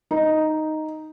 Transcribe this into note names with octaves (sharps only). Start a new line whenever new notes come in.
D#4